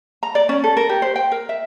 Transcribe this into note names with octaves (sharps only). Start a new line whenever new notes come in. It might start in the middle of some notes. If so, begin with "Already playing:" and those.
A#5
D5
C#4
A4
A#4
G4
C5
G5
A#4
E5